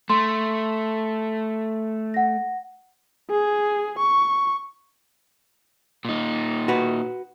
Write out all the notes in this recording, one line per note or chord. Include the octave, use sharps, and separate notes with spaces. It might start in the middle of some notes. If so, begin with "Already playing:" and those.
A3 C6
F#5 A#6
G#4
C#6
A#2 D#4
F#4 B4